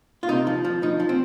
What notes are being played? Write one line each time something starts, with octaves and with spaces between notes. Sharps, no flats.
F4
C3 D#4
F3
F3
F3 D#4
F3
C4